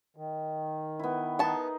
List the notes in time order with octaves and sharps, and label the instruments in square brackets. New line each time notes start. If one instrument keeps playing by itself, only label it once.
[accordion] D#3
[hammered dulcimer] B3 E4
[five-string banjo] B3 A5 [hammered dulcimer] D#4 G#4 A#4